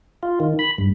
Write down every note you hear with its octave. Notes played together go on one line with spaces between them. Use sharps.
F4
D#3
B5
G2